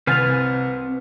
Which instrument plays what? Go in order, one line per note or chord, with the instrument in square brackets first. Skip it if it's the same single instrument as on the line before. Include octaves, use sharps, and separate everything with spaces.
[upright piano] C2 [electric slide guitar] C4 B4 G#5 [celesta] F6 A6 F7